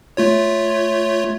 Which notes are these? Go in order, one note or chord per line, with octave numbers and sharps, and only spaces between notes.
A3 F4 C#5